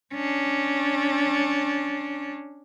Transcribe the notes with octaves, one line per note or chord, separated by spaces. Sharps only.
C#4 D4